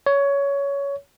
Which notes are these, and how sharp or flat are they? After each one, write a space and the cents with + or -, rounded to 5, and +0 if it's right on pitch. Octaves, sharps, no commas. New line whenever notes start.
C#5 +15